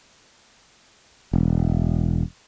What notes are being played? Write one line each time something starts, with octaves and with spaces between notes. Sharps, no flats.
E1